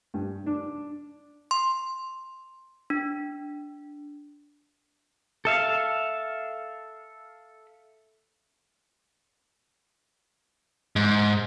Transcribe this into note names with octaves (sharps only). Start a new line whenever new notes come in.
G2
D4
C6
D4
A4 E5 F5
G#2